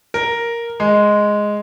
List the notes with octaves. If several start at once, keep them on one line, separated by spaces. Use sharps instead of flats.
A#4
G#3